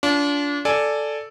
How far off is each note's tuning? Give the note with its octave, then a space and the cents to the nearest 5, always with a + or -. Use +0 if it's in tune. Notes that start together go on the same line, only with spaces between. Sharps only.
D4 -30 F4 +0
A4 +0 D5 +0 G#5 +5